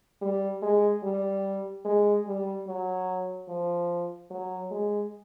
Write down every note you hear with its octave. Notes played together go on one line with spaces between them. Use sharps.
G3
G#3
G3
G#3
G3
F#3
F3
F#3
G#3